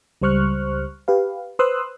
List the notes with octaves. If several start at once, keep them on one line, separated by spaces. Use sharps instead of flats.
C#2 G3 C5 C#6 F6 F#6
G4 B4 F5
B4 C5 C6 D#6 E6 F#6